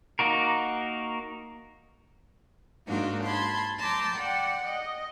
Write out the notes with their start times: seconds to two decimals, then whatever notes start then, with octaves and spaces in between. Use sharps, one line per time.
0.19 A#3 D#4 F#4 A#4
2.87 G#2 A#3 D4 D#4 F4 F#4
3.24 A5 B5 C6 G#6
3.79 A5 A#5 C6 D6 E6 G6
4.16 D5 F#5 G5
4.65 D#5